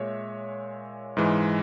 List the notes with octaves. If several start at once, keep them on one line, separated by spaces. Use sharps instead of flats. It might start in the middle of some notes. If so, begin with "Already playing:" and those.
Already playing: A#2 G#3 C#5 E5
G#2 E3 G#3